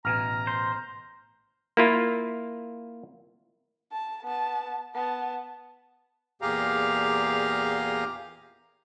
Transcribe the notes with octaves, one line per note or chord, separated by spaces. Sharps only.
A1 B2 G#5 A#5 F6
C5
A#3 E4 F4
A5
B3 A5
B3 A5
E2 A#2 G4 G#4 F5 A#5